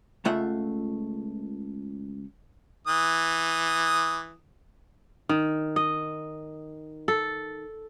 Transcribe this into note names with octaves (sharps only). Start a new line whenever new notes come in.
C#2 C#3 A3 F4 E5 F#5
E3 D#6
D#3
D#5
A4